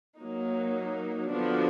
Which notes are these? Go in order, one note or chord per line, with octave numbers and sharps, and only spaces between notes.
F#3 A#3 D#4
D3 F3 B3 D4 F#4